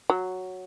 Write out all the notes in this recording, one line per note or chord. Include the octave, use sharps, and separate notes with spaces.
F#3